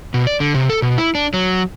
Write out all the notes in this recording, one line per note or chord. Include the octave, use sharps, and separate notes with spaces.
B2
D5
D3
C3
A4
B2
E4
D4
F#3